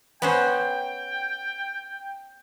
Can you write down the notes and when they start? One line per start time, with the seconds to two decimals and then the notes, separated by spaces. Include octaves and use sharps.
0.22 B3 C#4 C5 G5